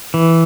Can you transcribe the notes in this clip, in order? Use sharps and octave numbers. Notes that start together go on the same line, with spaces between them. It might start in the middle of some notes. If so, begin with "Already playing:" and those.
E3